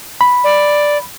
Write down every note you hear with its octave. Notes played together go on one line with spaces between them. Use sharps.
B5
D5